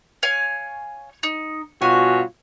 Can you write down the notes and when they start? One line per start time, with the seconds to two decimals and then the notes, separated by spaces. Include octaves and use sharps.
0.23 C#5 F5 G#5
1.23 D#4
1.82 G2 B2 F4 F#4 C#5 G#5